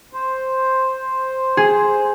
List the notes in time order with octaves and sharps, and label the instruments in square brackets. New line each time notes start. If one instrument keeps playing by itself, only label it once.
[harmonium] C5
[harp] G#4